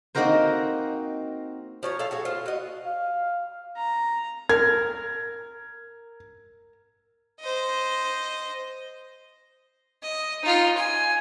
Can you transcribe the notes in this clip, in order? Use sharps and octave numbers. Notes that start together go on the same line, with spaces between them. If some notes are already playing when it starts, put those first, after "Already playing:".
A#3 C4 D#4 F#4 A#4 C5
F3 C#5 A#5
A4 F5
F#4 G#4 C#5
F4 C5
F#4 D#5
F5
A#5
A#4 G#6
C5 D#5
D#5
D#4 F4
G#5